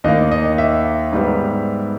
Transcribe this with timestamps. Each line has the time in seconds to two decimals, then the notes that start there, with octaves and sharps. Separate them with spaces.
0.04 D#2 D#3 A#3 D#5
0.31 D#5
0.58 E5
1.13 G#2 G3 B3